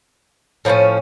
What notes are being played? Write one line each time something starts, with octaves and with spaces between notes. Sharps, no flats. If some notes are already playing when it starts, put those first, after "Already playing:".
A2 F3 A#3 C#4